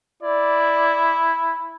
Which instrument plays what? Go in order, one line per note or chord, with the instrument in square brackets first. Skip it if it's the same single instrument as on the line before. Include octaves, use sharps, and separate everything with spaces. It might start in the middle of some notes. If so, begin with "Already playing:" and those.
[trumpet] E4 [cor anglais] D5